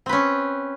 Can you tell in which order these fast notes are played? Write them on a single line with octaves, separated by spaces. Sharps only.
C4 B4 C#4